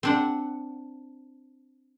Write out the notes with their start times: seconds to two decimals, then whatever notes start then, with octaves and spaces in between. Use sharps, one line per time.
0.03 C4 D4 F#5